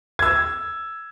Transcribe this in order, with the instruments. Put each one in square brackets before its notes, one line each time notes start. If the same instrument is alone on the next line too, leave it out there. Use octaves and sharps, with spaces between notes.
[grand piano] E6 G#6